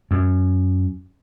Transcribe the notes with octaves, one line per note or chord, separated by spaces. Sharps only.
F#2